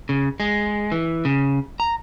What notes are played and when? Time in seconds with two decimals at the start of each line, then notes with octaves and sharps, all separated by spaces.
0.09 C#3
0.40 G#3
0.92 E3
1.25 C#3
1.80 A#5